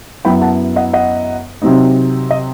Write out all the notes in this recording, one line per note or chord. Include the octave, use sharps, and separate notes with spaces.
F#2 F#3 B3 E4 G5 B5
F#5 A5
D#5 F#5
D#5 F#5
C3 F#3 C4 D#4
D#5